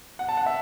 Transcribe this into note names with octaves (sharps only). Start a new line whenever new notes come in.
F#5
A5
F#5
E5